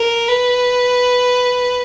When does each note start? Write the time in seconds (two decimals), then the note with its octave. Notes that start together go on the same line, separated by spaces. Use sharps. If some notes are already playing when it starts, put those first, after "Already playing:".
Already playing: A#4
0.28 B4